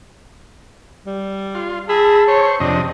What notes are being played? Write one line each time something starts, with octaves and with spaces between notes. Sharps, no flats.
G3
F4
G#4 A5 B5 E6
C5 C#5 C#6
F2 C3 D4 D#5